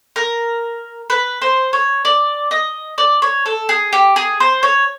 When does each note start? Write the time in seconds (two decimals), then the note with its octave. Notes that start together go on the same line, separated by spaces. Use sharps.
0.16 A#4
1.10 B4
1.42 C5
1.73 C#5
2.05 D5
2.51 D#5
2.98 D5
3.22 C#5
3.46 A4
3.69 G#4
3.93 G4
4.16 G#4
4.40 C5
4.63 C#5